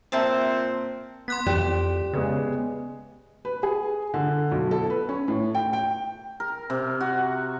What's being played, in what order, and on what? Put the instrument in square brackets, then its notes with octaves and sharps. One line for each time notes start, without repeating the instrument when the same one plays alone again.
[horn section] A#2 C4 [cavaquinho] E5 A5
[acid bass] B3 [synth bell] C6 F#6 B6
[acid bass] F2 [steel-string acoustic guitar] G4 [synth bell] D5
[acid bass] C#3 [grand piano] G#3 B3 G#4
[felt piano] B4
G#4
D3
B1
A4
B4
C#4
A2
G5
G5
[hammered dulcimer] A#4
C3
F#4